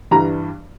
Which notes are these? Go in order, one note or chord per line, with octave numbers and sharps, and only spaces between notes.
G2 E3 G3 A#5